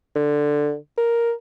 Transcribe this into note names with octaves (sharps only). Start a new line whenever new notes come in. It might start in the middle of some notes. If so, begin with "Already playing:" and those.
D3
A#4